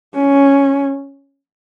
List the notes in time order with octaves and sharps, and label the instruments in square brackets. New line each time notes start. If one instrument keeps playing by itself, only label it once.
[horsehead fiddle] C#4